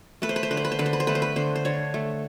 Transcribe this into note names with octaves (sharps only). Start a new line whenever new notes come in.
A3 B4
C5
B4
C5
D3 B4
C5
B4
C5
D3 B4
C5
B4
C5
A3 B4
C5
B4
D3 C5
C5
D3 C#5
A3